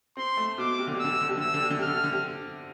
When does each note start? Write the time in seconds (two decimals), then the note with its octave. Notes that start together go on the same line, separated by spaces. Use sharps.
0.17 C4 C6
0.37 A3
0.58 B2 D6
0.79 C3
0.87 D3
0.95 C3
1.00 D3 E6
1.12 C3
1.21 D3
1.29 C3
1.37 D3
1.41 E6
1.46 C3
1.54 D3
1.62 C3
1.70 D3
1.79 C3 F6
1.87 D3
1.95 C3
2.04 D3
2.13 C3